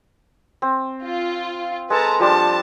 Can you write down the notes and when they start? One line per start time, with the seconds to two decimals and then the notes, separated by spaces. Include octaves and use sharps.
0.62 C4
1.04 F4
1.90 G#3 A4 B4 A5 A#5
2.20 F3 G3 D4 A5